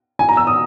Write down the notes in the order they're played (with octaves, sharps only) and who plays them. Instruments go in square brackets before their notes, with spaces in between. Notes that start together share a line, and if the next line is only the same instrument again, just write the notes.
[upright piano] G#5
A#5
E6
D#6